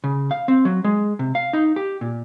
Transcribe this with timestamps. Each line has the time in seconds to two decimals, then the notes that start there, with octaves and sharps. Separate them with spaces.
0.04 C#3
0.31 F5
0.48 C4
0.65 F#3
0.84 G#3
1.19 C3
1.35 F5
1.53 D#4
1.76 G4
2.01 A#2